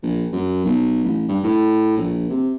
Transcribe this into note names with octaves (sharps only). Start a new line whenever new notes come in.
A#1
F#2
B1
A1
G2
A2
A#1
C3